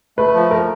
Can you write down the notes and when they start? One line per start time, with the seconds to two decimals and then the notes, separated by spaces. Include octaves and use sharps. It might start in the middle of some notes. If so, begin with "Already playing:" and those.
0.18 A3 B4
0.34 F3
0.51 F3 A#4